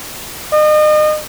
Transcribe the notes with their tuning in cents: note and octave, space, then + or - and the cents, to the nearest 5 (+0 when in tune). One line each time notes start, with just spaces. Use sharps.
D#5 -35